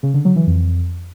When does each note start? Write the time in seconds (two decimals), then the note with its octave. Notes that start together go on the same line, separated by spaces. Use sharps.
0.03 C#3
0.14 D3
0.25 F#3
0.36 E3
0.47 F2